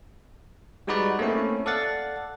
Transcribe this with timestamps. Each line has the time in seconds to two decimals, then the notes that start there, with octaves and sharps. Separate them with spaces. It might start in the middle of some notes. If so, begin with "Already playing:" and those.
0.87 G3 G#3 D#4 F#4 B4 D5
1.19 A3 A#3 C4 C#4 E4
1.66 A4 D5 F5 F#5 A6